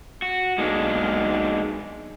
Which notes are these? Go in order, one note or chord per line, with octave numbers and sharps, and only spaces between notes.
F#4
B1 G#3 A#3 D4